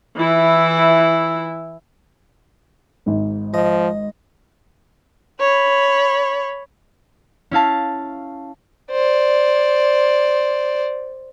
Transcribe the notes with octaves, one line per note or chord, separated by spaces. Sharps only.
E3 E4
G#1 G#2
F3 D#5
C#5 B5
C#4 E4 F5 A5
C5 D5